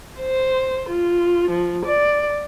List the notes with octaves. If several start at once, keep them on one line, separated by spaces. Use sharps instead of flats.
C5
F4
F3
D5